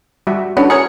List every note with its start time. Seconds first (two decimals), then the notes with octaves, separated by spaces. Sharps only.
0.27 G3 F#4 E5
0.57 B3 C#4 D4 E4 F#4 A4
0.70 G#4 A#4 C#5 C#7